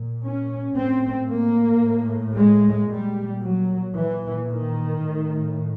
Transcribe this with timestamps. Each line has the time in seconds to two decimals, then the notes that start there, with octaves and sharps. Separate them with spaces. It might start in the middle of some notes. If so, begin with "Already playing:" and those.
Already playing: A#2
0.24 C#4
0.76 A2 C4
1.29 A#3
1.82 A2
2.36 G#3
2.89 A#2 G3
3.42 F#3
3.95 A#2 E3
4.48 D#3
5.02 A2